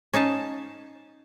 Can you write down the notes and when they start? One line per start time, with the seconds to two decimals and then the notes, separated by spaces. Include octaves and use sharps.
0.14 C#4 D#4 F5 A5